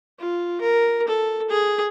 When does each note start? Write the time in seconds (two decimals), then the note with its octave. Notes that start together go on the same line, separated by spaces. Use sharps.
0.19 F4
0.61 A#4
1.08 A4
1.50 G#4